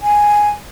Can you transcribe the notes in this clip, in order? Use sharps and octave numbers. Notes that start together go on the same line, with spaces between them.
G#5